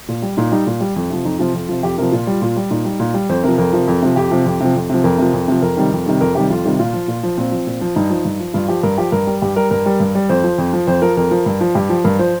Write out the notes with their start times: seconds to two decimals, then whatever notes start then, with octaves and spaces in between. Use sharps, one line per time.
0.08 A#2
0.22 G3
0.37 A#2 D#4
0.52 G3 D#4
0.67 A#2
0.80 G3
0.96 F2
1.10 C3 F3
1.25 F2 D#4
1.39 C3 F3 F4
1.54 F2
1.69 C3 F3
1.83 F2 G4
1.98 C3 F3 A#4
2.12 A#2 F4
2.27 G3
2.42 A#2
2.56 G3
2.71 A#2 D#4
2.85 G3
3.00 A#2
3.14 G3
3.29 F2 C5
3.43 C3 F3 A#4
3.58 F2 A#4
3.73 C3 F3
3.87 F2
4.02 C3 F3
4.16 F2 G4
4.31 C3 F3
4.46 F2
4.60 C3 F3
4.75 F2
4.89 C3 F3
5.04 F2 A#4
5.18 C3 F3
5.34 F2
5.48 C3 F3
5.62 F2 A#4
5.77 C3 D#3 G3
5.92 F2
6.06 C3 D#3 G3
6.21 F2 A#4
6.35 C3 D#3 G3 G4
6.50 F2 F4
6.65 C3 D#3 G3
6.79 A#2 F4
6.93 F3
7.08 A#2
7.23 F3
7.37 A#2 C4
7.52 F3
7.67 A#2
7.81 F3
7.96 G2 D#4
8.10 F3
8.25 G2
8.40 F3
8.54 G2 F4
8.68 F3 G4
8.83 G2 A#4
8.98 F3 G4
9.12 G2 A#4
9.27 G3
9.42 G2 G4
9.56 G3 A#4
9.71 G2 A#4
9.86 G3
10.00 G2
10.15 G3
10.29 F2 C5
10.44 F3
10.58 F2
10.73 F3
10.87 F2 C5
11.02 F3 A#4
11.17 F2 A#4
11.31 F3
11.46 G2
11.61 F3
11.75 G2 G4
11.89 F3
12.04 G2 A#4
12.19 F3 C5